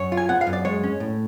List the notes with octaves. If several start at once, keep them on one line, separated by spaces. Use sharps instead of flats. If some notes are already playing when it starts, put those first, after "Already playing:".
Already playing: F#2 C#5
F4
G#5
B3 F#5
F5
F#2
D5
G#3 C#5
C#4
A2